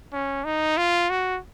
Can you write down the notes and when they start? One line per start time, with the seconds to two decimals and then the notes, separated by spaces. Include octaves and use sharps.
0.13 C#4
0.45 D#4
0.77 F4
1.10 F#4